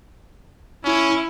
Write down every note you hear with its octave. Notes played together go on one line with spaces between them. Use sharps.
C#4 E4